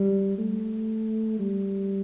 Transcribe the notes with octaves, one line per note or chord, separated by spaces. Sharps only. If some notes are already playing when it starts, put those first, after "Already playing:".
Already playing: G3
A3
G3